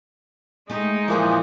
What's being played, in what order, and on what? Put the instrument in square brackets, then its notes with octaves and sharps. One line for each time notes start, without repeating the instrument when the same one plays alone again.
[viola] G#3 D#4 [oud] A3 G4
[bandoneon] A#2 E3 F3 [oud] E4 F#4 G#4